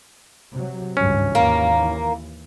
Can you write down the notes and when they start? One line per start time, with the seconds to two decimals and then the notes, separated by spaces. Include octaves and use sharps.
0.52 C3 F#3
0.97 G#1 C#2 G2 C#4
1.35 D#2 E3 A#3